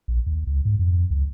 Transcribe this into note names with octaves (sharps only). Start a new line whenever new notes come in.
A#1
D#2
C#2
G#2
F2
C#2